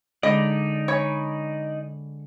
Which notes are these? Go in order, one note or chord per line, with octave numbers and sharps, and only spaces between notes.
D3 G#3 D#4 D5 D#5 B5
C#5 G#5 B5